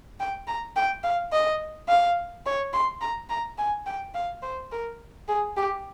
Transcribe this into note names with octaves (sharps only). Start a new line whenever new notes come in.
G5
A#5
G5
F5
D#5
F5
C#5
C6
A#5
A#5
G#5
G5
F5
C5
A#4
G#4
G4